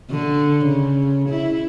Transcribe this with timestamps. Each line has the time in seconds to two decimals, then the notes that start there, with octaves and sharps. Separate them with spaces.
0.11 D3
0.66 C#3
1.29 E4